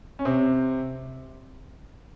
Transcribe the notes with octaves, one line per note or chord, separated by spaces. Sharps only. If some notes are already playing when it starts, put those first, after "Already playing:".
C#4
C3 C4